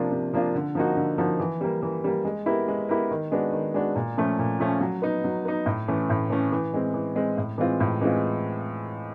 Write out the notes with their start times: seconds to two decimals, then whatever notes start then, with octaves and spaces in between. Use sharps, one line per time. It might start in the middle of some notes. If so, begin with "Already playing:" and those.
Already playing: C3 F3 A#3 D4 F4
0.11 C3
0.34 F3 A#3 D4 F4
0.55 D3
0.75 F3 A#3 D#4 F#4
0.96 D3
1.18 F3 A#3 D#4 F#4
1.40 E3
1.61 G3 A#3
1.82 E3
2.04 G3 A#3
2.25 G#3
2.46 B3 E4 G4 A#4
2.68 G#3
2.89 B3 E4 G4 A#4
3.11 D#3
3.32 G#3 B3 D4 F#4
3.53 D#3
3.74 G#3 B3 D4 F#4
3.96 A#2
4.18 F3 A3 C#4
4.39 A#2
4.60 F3 A3 C#4
4.81 F#3
5.02 B3 D#4
5.24 F#3
5.45 B3 D#4
5.66 A2
5.88 E3 A3 C#4
6.10 A2
6.30 E3 A3 C#4
6.52 E3
6.74 G#3 C4
6.94 E3
7.16 G#3 C4
7.37 A2
7.58 E3 G#3 C4 F4
7.80 A2
8.01 E3 G#3 C4 F4